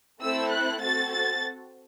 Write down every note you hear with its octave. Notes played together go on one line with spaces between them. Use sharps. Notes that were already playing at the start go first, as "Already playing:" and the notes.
A3 C4 E4 A4 E6
F#6
C4 F#4 A4 A6
A6